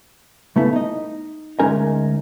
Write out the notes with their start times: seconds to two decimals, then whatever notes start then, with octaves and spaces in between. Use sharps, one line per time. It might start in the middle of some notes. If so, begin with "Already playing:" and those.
0.56 C#3 A3 B3 E4 A4
0.73 D#4 D#5
1.59 D2 G#3 C#4 D#4 A#4 G#5